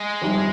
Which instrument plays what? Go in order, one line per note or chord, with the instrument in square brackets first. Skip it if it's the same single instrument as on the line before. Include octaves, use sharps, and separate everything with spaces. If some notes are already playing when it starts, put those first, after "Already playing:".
Already playing: [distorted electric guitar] G#3
[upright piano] G1 F2 C3 D#3 G3